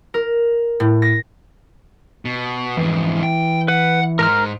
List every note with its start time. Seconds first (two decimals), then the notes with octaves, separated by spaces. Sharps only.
0.14 A#4
0.80 A2
1.02 A#6
2.25 B2
2.77 F2 G#2 E3
3.23 G5
3.68 B4 F#5
4.19 G#2 A#4 A#5 F6